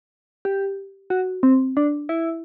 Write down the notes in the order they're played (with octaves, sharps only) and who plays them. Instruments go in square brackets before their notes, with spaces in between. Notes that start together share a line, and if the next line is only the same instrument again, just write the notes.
[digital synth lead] G4
F#4
C4
D4
E4